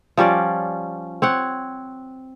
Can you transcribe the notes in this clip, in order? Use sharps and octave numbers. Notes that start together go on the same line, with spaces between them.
F3 G3 C#4 D5
C4 C#5 F#5